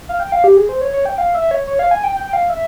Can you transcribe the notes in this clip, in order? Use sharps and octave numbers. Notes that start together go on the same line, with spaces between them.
F5
G5
F5
G4
G#4
C5
C#5
C#5
G5
F5
E5
C#5
C#5
F5
G#5
G5
G5
F5
E5